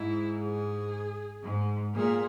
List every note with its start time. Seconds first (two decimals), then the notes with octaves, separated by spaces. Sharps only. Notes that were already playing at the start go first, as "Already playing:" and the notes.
Already playing: G#2 E4
0.41 G#4
1.44 G#2
1.96 A#2 G#4